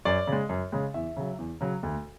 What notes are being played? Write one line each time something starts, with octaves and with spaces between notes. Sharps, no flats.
F#2 D5
C#3
G#3
F#2
C#3 G#3
E2 E5
C#3 F#3
E2
C#3 F#3
D2